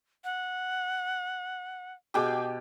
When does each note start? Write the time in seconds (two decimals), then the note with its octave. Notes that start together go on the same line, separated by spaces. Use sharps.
0.24 F#5
2.14 B2 G4 G#4 G5 D6